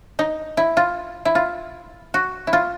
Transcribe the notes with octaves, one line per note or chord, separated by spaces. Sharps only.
D#4
E4
F4
E4
F4
F#4
E4
F4